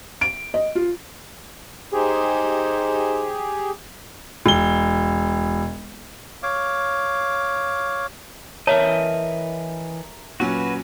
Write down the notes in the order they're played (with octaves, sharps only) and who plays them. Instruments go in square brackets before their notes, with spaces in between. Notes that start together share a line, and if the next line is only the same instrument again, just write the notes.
[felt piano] D7
D#5
F4
[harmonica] D#4 C5 [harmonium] G4 G#4
[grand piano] E1 G7
[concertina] C#5 F5 D6
[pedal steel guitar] E3 D#5 [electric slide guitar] A#4 E5 A5 [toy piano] C#5 [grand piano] A#5
[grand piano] A#2 F#3 C#4 [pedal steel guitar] F#4 B4